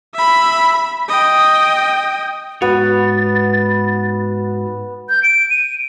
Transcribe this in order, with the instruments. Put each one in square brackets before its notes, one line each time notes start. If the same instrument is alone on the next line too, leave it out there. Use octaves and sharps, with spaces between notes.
[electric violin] E5 B5
D#5 G5
[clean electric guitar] G#2 C#5 [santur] B3 [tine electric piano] F#4 [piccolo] A6
[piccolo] G6
D7
D#7